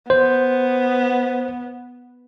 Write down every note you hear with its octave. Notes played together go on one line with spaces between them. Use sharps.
B3 C5